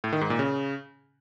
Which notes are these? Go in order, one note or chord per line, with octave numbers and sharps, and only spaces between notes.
A2
D#3
G#2
A#2
C#3